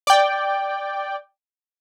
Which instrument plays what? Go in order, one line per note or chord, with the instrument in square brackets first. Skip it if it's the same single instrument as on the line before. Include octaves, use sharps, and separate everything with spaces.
[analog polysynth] D5 G5